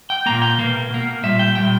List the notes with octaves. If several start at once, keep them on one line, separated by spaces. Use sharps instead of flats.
G5
A#2 A#3 A#5
G5
B2 A#3
B2 A#3
A#2 G3 E5
G5
A#2 G3 G5